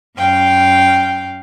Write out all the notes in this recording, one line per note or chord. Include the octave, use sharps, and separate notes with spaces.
F#2 F5 G5